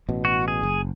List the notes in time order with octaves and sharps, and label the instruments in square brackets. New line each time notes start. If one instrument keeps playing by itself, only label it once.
[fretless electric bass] A1 B2
[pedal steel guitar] F#4
G#4
[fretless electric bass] F#1